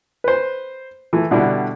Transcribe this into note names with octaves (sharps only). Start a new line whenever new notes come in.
B4 C5
E3 A3
B2 D3 G3 D4 E4